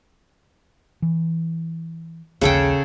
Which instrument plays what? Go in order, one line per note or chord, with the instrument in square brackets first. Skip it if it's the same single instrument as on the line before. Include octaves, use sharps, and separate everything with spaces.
[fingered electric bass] E3
[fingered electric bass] A#1 D#2 [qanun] C#3 A4 G5